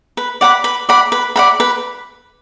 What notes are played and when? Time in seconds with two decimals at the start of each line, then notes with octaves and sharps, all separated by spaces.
0.17 B4
0.41 D5 F#5 B5
0.64 B4
0.89 D5 F#5 B5
1.12 B4
1.36 D5 F#5 B5
1.60 B4